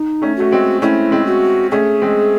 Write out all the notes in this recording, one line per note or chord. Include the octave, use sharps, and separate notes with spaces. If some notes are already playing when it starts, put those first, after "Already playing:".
Already playing: D#4
A3 C#4
A3 F#4
G#3 C4
A3 C#4 E4
G#3 C4
F#4
A3 C#4 G#4
G#3 C4